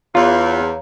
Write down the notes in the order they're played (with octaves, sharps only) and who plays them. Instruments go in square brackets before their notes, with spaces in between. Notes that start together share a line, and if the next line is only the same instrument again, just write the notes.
[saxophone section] E2 [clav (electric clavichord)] F4 [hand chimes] C#5 F5 A#5